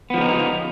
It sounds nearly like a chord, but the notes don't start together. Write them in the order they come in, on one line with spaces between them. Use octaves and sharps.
B3 F3 C#3 D#4